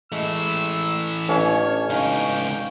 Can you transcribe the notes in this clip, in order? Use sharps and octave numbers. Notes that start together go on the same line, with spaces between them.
E3 G#3 A3 E6
A1 C#4 D4 C#5
C#2 D#4 F5 G5